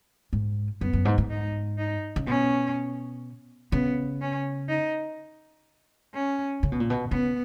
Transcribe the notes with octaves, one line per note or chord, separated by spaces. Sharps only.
G#2
F#2 B3
F#2
G#2
G#2
D#4
D#4
C#3
B2 C#4
C#3 B3
C#4
D#4
C#4
C#3
B2
A#2
B2
C#3 B3